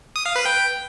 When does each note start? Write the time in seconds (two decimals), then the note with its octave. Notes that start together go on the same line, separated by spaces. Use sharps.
0.16 D#6
0.26 F5
0.36 B4
0.45 G5